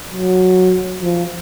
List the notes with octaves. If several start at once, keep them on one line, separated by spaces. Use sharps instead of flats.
F#3
F3